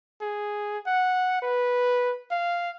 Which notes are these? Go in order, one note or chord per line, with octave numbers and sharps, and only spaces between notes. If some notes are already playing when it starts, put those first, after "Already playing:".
G#4
F#5
B4
F5